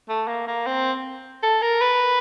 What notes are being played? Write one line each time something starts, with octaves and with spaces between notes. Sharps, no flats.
A3
A#3
A#3
C4
A4
A#4
B4